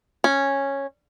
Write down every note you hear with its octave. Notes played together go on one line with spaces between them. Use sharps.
C#4